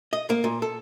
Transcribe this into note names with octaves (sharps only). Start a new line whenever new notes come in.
D#5
A#3
A#2
A4